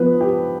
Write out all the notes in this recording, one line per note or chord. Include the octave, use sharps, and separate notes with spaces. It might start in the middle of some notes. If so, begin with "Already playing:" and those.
Already playing: F3 B3 B4
G4